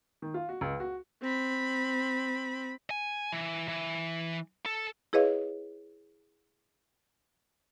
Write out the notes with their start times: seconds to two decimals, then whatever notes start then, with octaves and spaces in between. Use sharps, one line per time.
0.22 D#3
0.34 F4
0.49 F#4
0.61 C#2
0.80 F#4
1.22 C4 B5
2.91 G#5
3.32 E3
3.68 E3
4.66 A4
5.13 E4 G#4 B4 C#5 D#5 F5